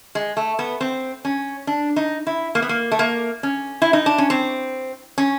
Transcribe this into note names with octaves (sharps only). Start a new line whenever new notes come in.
G#3
A3
B3
C4
C#4
D4
D#4
E4
A#3
B3
A#3
A3
A#3
C#4
E4
D#4
D4
C#4
C4
C#4